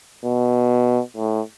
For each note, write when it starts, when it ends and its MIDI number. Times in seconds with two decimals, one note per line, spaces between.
0.25 1.01 47
1.17 1.41 45